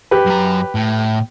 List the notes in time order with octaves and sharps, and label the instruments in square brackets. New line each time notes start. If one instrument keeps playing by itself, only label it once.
[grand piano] G4 B4
[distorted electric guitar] F#2 A#5
A2